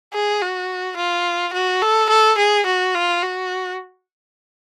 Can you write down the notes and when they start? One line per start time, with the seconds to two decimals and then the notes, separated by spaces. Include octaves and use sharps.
0.13 G#4
0.42 F#4
0.97 F4
1.53 F#4
1.82 A4
2.10 A4
2.38 G#4
2.66 F#4
2.95 F4
3.22 F#4